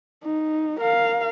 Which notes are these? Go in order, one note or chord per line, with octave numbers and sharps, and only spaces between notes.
D#4
A#4 F5